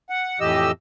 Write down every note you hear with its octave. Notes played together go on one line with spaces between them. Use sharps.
F#5
F2 A2 E3 G4 D#5 E6